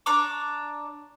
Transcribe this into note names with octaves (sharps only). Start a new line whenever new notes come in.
D4 A#5 C#6 D6